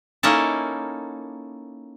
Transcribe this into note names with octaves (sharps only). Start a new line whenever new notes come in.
A#3 C#4 D#4 E4 A4